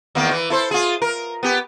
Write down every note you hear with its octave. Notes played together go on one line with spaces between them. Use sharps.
E2 D#3 A#3
E3
E4 A4 C5
F4 G#4
A#4
B3 G4